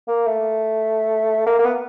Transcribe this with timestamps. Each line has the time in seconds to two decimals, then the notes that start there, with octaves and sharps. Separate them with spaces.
0.08 A#3
0.26 A3
1.46 A#3
1.59 A#3
1.64 B3